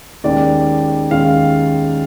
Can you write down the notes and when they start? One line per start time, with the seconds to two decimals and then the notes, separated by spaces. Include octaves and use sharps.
0.24 D#2 D#3 G#3 C#4 D5
1.11 D#2 D#3 G#3 C#4 F5